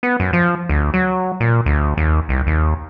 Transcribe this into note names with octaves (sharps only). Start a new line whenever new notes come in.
B3
F#2
F3
D2
F#3
A#2
D2
D#2
C2
D#2